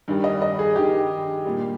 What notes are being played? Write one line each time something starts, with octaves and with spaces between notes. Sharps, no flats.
G2 D#3 G3
D#5
D#5
G#4
G2 D#3 G3 G4
A#2 G3